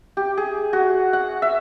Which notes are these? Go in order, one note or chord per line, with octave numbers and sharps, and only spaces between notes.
G4
G#4
F#4
F#5
E5